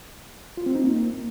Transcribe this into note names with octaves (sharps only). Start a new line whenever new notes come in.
F4
C4
D#4
A#3